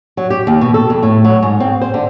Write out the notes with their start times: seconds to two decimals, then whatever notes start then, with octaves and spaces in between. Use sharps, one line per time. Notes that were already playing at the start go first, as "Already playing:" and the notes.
0.17 F#3
0.30 G4
0.47 D#2
0.61 B2
0.74 A4
0.90 F2
1.02 A2
1.24 F#3
1.43 G#2
1.60 C4
1.81 C5
1.94 D3